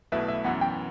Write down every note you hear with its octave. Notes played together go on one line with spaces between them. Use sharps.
B1 B2 A3 E4 B4 E5
E5
F#2 E3 B3 F#5
G5